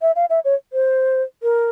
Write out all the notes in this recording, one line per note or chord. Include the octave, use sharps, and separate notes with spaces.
E5
F5
E5
C#5
C5
A#4